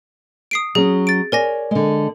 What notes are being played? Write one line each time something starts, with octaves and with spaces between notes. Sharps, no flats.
D#6 C7 D7
F#3 C#4 G#4
A6 D7
A#4 C#5 D5 G#5 A#6
D3 G#3